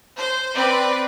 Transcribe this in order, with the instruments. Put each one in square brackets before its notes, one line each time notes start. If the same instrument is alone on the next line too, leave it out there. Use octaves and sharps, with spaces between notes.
[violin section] C5
C4 B4 D5